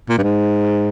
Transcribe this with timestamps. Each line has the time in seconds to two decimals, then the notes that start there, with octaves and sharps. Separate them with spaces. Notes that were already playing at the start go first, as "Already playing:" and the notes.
0.09 A#2
0.18 G2
0.23 G#2